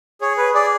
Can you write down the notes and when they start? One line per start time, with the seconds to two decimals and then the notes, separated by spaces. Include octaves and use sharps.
0.21 G#4 C#5
0.37 B4
0.54 G#4 D5